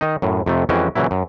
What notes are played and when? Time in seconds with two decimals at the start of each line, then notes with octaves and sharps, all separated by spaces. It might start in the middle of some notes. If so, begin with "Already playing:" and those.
0.01 D#3 D#4
0.22 F#2 A2
0.46 F2 C3 A3
0.69 F2 E3 G#3 C#4 F#4 G5
0.95 A#2 C#3 E3 F#3 E4
1.11 F#2